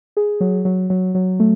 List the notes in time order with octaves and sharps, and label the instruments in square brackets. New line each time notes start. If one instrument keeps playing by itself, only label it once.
[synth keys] G#4
F#3
F#3
F#3
F#3
A3